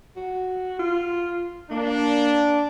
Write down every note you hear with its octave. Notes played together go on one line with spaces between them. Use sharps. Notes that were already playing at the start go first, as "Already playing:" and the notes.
F#4
F4
A#3 D4